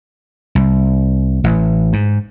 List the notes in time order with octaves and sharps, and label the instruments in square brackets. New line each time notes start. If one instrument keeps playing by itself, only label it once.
[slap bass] C2
A1
G#2